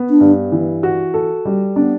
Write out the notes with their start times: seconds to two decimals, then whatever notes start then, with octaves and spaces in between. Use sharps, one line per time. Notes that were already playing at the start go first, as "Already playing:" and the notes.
Already playing: B3
0.10 D4
0.21 G2
0.52 E3
0.83 F#4
1.14 A4
1.45 G3
1.76 B3 D4